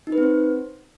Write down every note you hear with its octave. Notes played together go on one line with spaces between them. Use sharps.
D#4
B4
C4
C5